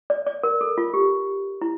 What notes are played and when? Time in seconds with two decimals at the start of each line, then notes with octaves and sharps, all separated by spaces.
0.10 D5
0.27 D5
0.43 A#4
0.61 A4
0.78 F4
0.94 G4
1.61 E4